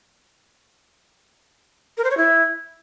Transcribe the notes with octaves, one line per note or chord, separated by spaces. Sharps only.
A#4
C5
C#5
E4